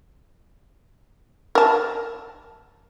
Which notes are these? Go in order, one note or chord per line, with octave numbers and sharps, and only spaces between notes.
A#4 A5